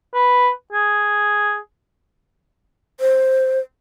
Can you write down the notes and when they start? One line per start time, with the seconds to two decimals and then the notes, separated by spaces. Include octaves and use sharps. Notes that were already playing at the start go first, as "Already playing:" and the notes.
0.14 B4
0.73 G#4
3.00 C5